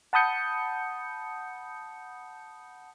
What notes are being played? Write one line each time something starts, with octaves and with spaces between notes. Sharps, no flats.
F#5 A5 B5 D#6 G6 C#7